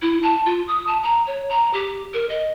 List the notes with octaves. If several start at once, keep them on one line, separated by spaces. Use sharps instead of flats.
E4
A5
F4
D#6
A5
A#5
C#5
A#5
G4
A#4
D#5